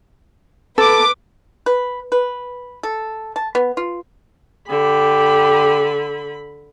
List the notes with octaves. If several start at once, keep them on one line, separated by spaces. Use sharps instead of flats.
A4 B4 D6
B4
B4
A4
A5
B3
F4
D3 G4 B5